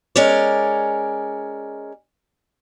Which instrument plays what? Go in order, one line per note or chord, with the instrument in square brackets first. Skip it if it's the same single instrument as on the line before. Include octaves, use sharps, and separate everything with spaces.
[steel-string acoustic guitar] G#3 C#4 A#4 D5